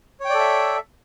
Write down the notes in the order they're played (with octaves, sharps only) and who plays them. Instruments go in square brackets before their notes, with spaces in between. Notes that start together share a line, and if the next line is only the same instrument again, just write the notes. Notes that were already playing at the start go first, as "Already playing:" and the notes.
[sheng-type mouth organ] C#5
G5
D5
A4
E5